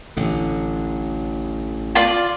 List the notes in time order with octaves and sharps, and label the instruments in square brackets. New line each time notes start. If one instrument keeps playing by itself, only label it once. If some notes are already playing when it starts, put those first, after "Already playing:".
[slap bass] A1 D3
[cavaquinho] F4 D5